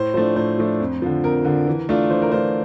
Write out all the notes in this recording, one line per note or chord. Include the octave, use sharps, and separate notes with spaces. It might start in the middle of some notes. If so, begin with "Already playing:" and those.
Already playing: A2 C5
F3 A3 D4 C5
A2 C5
F3 A3 D4
F2
D3 F3
F2 A#4
D3 F3
E3
A3 D4 F4
E3 C5
A#4
A3 D4 F4 C5